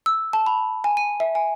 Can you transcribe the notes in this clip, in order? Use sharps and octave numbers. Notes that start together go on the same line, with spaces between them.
E6
A5
B5
G#5
D#7
E5
G#5